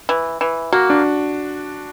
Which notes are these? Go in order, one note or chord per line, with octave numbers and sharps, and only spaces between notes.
E3
E3
A#3 F#4
D4